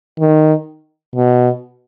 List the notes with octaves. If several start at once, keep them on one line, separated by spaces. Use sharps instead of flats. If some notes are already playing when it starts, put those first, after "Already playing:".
D#3
B2